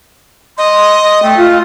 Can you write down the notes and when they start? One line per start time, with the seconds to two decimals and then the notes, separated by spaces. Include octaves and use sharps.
0.58 D#5 C6
1.22 A3 G5
1.37 F4